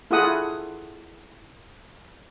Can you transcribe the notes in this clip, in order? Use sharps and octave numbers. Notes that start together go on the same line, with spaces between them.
E4 F4 G#4 A4 F#5 D#6